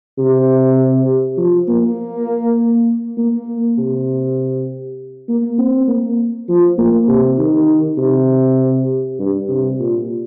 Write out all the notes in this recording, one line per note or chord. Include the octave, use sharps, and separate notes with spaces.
C3
F3
A#3
A#3
C3
A#3
C4
A#3
F3
A#3
C3
D#3
C3
G2
C3
A#2